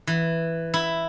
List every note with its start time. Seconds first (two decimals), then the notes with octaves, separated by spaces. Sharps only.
0.07 E3
0.74 E4